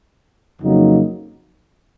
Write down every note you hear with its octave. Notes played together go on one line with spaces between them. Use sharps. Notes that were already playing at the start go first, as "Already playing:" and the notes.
F2 C#3 F#3 A#3 D#4